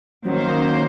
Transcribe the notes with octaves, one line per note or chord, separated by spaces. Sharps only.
D#3 F#3 A#3 C#4 C5